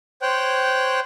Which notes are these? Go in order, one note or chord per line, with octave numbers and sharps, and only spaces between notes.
C5 C#5 G5 F#6